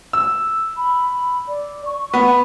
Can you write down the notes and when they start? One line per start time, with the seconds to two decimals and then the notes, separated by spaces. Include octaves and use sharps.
0.13 E6
0.77 B5
1.48 D5
1.86 C#6
2.14 B3 B5